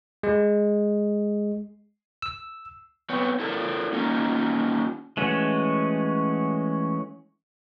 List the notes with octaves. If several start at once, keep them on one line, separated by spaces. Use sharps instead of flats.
G#3
E6
B3 C4 B4 C#5
E4 A4 A#4
A#3 C#4 D#4 F4
E3 G#3 A3 C#4 F#4